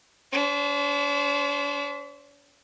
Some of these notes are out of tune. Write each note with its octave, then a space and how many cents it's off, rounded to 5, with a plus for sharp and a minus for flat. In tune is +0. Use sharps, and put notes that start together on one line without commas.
D4 -45 C5 +0